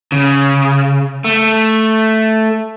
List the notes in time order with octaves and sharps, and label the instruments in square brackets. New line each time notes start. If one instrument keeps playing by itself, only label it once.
[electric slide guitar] C#3
A3